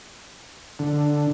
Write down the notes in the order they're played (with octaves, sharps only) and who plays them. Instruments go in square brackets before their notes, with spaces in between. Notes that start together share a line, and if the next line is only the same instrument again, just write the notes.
[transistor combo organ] D3